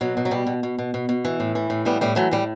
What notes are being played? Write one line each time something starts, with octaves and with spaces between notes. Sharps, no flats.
B2 F#3
B2
F#3
B2 G3
B2
B2
B2
B2
B2
E3
A2
E3
A2
E3 G3 B3
A2 G3
E3 F#3 A3
A2 G3